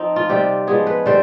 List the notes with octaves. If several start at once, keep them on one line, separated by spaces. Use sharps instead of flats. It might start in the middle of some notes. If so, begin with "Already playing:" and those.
Already playing: F3 C4 D#4
F4
C3 G3 C4 G4
F3 G#3 B3 G#4
B4
D3 G3 D4 C5